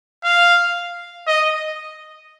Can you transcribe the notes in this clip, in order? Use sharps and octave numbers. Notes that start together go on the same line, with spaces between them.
F5
D#5